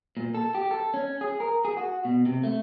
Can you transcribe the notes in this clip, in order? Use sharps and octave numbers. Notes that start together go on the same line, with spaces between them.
A#2
A4
G4
A4
C#4
G#4
A#4
G#4
F#4
B2
C3
A3